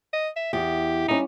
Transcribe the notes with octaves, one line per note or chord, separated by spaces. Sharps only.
D#5
E5
E2 G4
G3 C#4 D#4